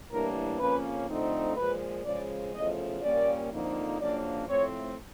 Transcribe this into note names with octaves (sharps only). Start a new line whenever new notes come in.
A2 E3 G3 A#3 D4 A#4
F2 C#3 F3 A#3 C#4 B4
D3 F3 A3 C4 D#4
A#2 F3 G#3 B4
C#3 F3 G#3 D5
E2 C#3 F3 A3 D#5
A#2 G3 A#3 C#4 D5
F2 D3 F3 A#3 D#4
F#2 C#3 F3 A#3 D4 D5
A2 F3 A3 C4 C#5